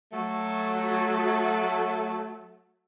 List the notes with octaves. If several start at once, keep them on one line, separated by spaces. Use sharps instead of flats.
F#3 A3